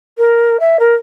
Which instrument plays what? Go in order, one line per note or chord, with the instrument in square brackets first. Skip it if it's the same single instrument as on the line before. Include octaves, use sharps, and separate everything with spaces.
[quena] A#4
E5
A#4